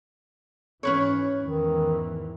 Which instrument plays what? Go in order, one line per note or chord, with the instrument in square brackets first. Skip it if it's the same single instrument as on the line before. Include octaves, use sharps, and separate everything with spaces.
[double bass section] G#2 E3 [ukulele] C#4 B4 C#5
[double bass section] E2 G#2 E3 [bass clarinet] D#3